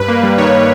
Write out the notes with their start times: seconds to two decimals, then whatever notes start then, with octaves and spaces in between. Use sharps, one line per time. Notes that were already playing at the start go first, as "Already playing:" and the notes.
Already playing: G2 B4
0.08 A#3
0.23 G3
0.38 D#3 C#5